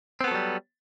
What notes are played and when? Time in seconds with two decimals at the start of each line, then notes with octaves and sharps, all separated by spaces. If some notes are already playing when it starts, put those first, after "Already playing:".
0.21 C4
0.24 B3
0.28 A4
0.31 F#3
0.35 G3